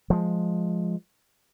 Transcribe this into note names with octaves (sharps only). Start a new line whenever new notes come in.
F3 G#3